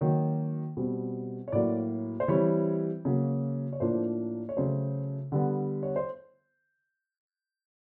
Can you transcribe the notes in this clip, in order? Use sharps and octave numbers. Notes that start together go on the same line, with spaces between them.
D#3 F#3 A#3 C#5
B2 G3 C4
C#5
A2 F#3 A#3 D5
C5
E3 G3 C4 C#5
C#3 F#3 A#3
C#5
A2 F3 A#3 D4 C5
C#5
C#3 F#3 A3 C5
D3 G3 B3
C#5
C5